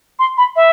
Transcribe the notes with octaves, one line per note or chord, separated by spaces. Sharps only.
C6
B5
E5